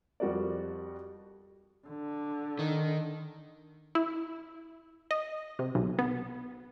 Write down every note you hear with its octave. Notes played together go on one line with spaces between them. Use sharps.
F2 G3 F#4 A#4 D5
D3
D#3
E4
D#5
C3
B1
B3